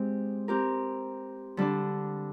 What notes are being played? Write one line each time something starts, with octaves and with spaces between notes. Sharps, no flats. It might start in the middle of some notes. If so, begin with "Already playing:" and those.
Already playing: G#3 C4 G4
C4 G4 A#4
D3 G3 D4